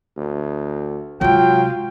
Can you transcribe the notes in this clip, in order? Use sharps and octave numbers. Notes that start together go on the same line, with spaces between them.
D2
C3 F#3 G#3 F4 G5